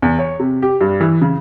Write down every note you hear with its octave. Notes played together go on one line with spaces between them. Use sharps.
E2
C#5
C3
G4
G2
E3
C#3